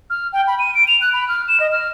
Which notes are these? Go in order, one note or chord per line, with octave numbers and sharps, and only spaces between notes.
F6
G5
B5
D#7
D7
F7
F#6
B5
F6
E7
D#5
F6